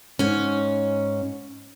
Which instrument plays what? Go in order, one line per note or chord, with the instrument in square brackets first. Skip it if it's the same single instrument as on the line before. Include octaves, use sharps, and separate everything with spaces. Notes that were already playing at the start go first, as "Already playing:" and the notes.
[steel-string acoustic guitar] G#2 C#4